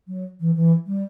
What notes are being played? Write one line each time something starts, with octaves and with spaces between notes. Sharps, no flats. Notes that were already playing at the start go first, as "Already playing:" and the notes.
F#3
E3
E3
G3